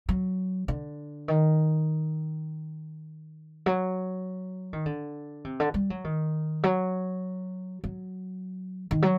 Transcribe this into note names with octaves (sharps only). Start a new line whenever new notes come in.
F#3
D3
D#3
F#3
D#3
D3
C3
D3
G3
F#3
D#3
F#3
F#3
D#3
F#3